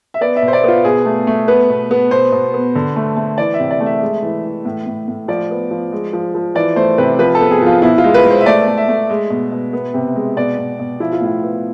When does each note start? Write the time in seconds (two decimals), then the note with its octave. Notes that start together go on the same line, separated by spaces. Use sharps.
0.14 E5
0.21 B3 D5
0.36 E5
0.42 B2
0.48 C5
0.53 D5
0.64 B3 F4
0.84 B2 G#4
1.05 A3
1.27 A3
1.48 B3 B4
1.70 B2
1.91 B3
2.11 B2 C5
2.32 B2
2.54 B3
2.75 D3
2.96 A3
3.17 A3
3.38 E3 D5
3.54 E5
3.60 C3
3.71 D5
3.80 A3
3.86 E5
4.02 G#3
4.23 E3
4.44 E3
4.65 A2
4.86 A2
5.08 A2
5.28 F3 D5
5.50 B3
5.71 F3
5.93 G#3
6.13 F3
6.35 F3
6.55 E3 D5
6.76 A3 C5
6.98 C3 B4
7.19 F3 B4
7.35 A4
7.41 B3
7.51 G#4
7.62 F3 F4
7.82 B2 E4
7.98 F4
8.04 G#3
8.14 B4
8.24 G#3
8.31 C5
8.41 E5
8.46 A3 D5
8.67 A3
8.78 E5
8.88 A3
9.10 G#3
9.30 B2
9.52 B2
9.73 B3
9.94 C3
10.16 G#3
10.37 B2 D5
10.58 B2
10.79 B2
11.00 F3 E4
11.13 F4
11.21 A2 E4
11.43 B3